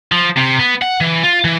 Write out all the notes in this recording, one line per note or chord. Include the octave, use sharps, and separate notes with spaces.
F3
C3
B3
F#5
E3
F4
E3